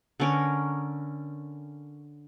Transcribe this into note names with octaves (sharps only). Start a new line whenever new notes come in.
D3 C#4 A#4